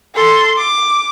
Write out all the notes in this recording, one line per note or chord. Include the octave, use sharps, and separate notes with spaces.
A4 C6
D6